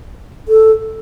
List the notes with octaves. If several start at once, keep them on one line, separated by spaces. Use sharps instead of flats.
A4